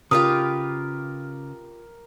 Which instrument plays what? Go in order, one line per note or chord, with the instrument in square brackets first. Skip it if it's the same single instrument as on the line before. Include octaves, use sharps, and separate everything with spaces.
[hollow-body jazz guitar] C#3 [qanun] F4 G4 B4 [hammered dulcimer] A#4 [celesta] D#6